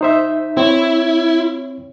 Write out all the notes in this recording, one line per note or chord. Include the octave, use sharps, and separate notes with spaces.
D#4 C5 E5
C4 E4 C#5